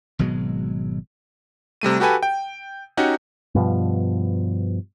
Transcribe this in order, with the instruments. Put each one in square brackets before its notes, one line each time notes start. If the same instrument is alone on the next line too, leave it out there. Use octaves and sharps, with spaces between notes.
[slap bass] G#1 B2 F#3 G#3
[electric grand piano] C3 G3 A3 D#7
F#4 G4 A4 B4 G#5
G5
C#4 D#4 F#4 G4 F#5
[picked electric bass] G2 B2 F3